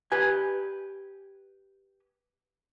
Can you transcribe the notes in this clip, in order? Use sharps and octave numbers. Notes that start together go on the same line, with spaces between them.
G4 B4 G#5